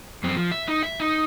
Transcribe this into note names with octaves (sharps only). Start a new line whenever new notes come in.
F#2 C4
F3
E5
D#4
E5
D#4